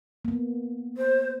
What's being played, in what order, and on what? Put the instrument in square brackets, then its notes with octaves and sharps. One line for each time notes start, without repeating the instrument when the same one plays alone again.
[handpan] A#3 B3
[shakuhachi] C5